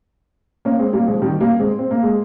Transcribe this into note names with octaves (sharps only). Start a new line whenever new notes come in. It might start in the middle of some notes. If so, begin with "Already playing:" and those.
A#3 C#4
G#3 C4
G3 A#3
F3 G#3
D#3 G3
G3 A#3
G#3 C4
C4
A#3
G#3